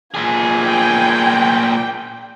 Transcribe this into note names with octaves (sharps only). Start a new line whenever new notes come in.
A#2 G#4 G#5
G5